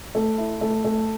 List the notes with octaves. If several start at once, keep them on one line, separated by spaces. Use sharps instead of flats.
A3
E4
A3
A3